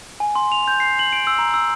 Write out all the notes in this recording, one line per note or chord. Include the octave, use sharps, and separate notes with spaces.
G#5
C6
F7
G6
C7
F#7
D7
E6
A#5
E6